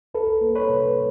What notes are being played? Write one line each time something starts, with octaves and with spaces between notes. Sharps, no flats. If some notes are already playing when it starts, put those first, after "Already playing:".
C2 A4 B4
A#3
B4 C#5
C3